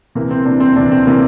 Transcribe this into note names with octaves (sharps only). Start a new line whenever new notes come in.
C3 E3 A#3
C4
C3 E3 D4
C4
C3 E3 D4
C4
C3 E3 A#3